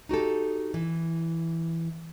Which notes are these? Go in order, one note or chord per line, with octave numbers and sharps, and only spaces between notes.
D#4 F#4 G4 A4
E3